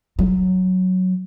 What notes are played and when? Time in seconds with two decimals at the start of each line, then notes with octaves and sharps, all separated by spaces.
0.19 F#3